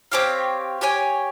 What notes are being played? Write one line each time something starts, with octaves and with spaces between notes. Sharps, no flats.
C4 G4 C#5 F5
G4 C#5 G#5